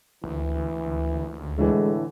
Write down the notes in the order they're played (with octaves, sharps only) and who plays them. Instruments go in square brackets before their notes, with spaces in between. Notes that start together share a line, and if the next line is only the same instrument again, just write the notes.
[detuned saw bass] D2 [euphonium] E3
[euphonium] A2 [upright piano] D3 E3 [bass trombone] G#3